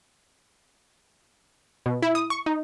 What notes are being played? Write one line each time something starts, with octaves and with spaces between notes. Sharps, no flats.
B2
E4
D#6
C#6
D#4